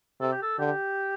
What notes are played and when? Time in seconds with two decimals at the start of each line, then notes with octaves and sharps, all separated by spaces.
0.20 C3 A4
0.32 G4
0.42 A4
0.58 D3 G4